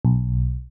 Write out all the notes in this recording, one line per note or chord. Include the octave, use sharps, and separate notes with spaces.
B1